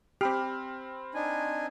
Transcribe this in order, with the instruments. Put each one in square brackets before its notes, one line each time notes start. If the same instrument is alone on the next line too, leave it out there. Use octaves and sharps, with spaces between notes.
[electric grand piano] C4 B5 F6 [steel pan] G4
[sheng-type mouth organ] D4 D#4 G#5